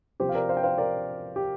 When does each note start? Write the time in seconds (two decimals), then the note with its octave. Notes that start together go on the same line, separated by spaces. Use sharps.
0.20 C3 F3 G4 C5
0.29 F5
0.35 A#4 D5
0.49 C5 F5
0.57 G5
0.63 C5 F5
0.78 A#4 D5
1.36 G4